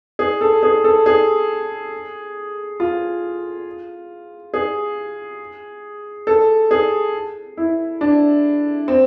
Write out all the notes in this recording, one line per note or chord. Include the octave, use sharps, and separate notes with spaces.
G#4
A4
G#4
A4
G#4
F4
G#4
A4
G#4
E4
D4
C4